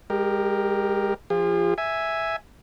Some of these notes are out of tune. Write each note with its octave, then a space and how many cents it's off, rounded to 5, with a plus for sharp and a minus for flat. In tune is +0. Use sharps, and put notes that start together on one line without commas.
G#3 -30 G4 +0 A#4 +0
F3 -5 F4 +0 G#4 -40
E5 +0 G#5 +0